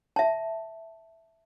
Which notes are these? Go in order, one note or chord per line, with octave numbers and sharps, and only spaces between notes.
E5 A5